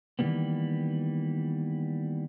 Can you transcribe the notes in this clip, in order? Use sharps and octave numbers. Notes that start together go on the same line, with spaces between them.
D#3 E3 G3 A#3 B3